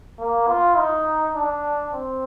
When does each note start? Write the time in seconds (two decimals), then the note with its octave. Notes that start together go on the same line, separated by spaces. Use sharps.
0.19 A#3
0.48 F4
0.77 D#4
1.35 D4
1.93 C4